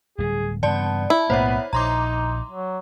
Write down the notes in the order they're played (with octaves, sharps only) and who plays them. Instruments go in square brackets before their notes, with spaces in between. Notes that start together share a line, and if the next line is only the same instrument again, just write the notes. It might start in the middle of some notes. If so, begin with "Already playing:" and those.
[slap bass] D1 G3 [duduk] G#4
[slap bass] G2 C#3 E3 [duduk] B3 [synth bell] D5 A5
[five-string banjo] E4
[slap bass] B1 A2 A#3 [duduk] B3 [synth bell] C5 C#5 E5
[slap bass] A#1 [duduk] D#4 [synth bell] A#5 C6 D6
[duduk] F#3